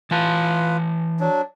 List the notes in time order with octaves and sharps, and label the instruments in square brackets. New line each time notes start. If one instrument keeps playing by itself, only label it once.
[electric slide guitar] E3 A5 [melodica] F4 B4
[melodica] F#3 D4